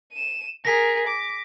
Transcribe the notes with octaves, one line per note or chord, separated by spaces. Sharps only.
D#7 E7
G#4 A#4 A#6 B6
D6